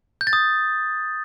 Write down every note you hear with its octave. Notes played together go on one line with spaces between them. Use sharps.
G6
A6
D#6